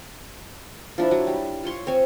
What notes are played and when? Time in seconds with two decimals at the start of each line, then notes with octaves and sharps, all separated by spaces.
0.98 F3 D4 E4
1.11 F#3
1.27 G3
1.64 F4 C#5 C6 C#6
1.87 C4 C#5 G#5